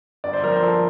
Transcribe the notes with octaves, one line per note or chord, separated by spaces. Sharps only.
G1 D5
C5
F2 A#4
C5
F3 A4